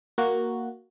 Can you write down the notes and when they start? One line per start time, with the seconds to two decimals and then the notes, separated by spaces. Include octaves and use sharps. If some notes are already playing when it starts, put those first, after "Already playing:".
0.18 A#3 F#4